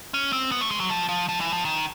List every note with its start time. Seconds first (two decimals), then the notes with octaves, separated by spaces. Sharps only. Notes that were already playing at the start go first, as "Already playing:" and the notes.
0.14 C#4
0.33 C4
0.52 B3
0.61 A3
0.71 G#3
0.80 F#3
0.90 F3
1.09 F3
1.29 F3
1.40 E3
1.53 F3
1.65 D#3